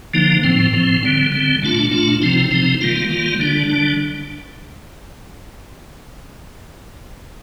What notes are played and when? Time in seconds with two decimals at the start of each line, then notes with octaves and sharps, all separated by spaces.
0.14 D3 F3 A#3 D#4
0.43 A2 F3 C4
0.73 A2 F3 C4
1.03 D3 G3 C4
1.32 D3 G3 C4
1.62 A#2 A3 D4 F4
1.91 A#2 A3 D4 F4
2.22 C3 F3 C4 D#4
2.51 C3 F3 C4 D#4
2.81 D#3 G3 A#3 F4
3.10 D#3 G3 A#3 F4
3.40 D3 G3 D4
3.70 D3 G3 D4